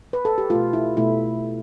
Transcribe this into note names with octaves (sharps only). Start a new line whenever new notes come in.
B4
A4
G4
B2 A3 F4
E4
B2 A3 E4